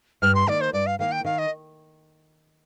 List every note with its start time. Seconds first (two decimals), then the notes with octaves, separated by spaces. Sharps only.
0.22 G2 F6
0.35 C6
0.47 D#3 A#3 D5
0.61 C5
0.73 G2 D5
0.86 F5
0.99 D#3 A#3 F5
1.12 G5
1.25 D#3 F5
1.38 D#5